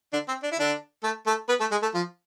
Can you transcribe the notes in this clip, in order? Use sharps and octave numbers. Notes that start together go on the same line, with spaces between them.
D3 D4
C4
D4
E4
D3 D4
A3 A4
A3 A4
B3 B4
A3 A4
G#3 G#4
A3 A4
F3 F4